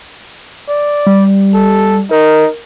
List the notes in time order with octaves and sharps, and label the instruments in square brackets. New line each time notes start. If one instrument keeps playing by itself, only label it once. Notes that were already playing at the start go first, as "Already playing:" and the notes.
[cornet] D5
[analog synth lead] G3
[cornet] A4
[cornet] D#4 [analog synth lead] A#4